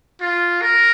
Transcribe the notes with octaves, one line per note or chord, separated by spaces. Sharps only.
F4
A#4